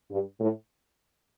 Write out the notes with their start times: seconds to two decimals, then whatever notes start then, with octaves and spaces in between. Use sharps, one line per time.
0.10 G2
0.40 A2